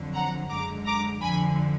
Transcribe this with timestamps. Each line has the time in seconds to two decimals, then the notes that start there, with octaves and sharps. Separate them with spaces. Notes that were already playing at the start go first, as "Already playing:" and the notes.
Already playing: F2 D3 F#3
0.14 F#5 A#5
0.50 F#2 D3 G#3 A#5 D6
0.86 A#5 D6
1.22 F2 D3 F3 G#5 B5